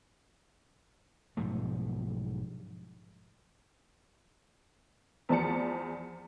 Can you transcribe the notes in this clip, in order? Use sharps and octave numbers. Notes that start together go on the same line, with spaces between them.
B1 G#2 F3 A3
E2 F3 D5 A5 C#7